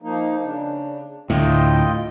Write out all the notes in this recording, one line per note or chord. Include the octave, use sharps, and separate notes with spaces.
F3 A#3 D#4
C#3 D4
D2 A2 F4 D#5 G5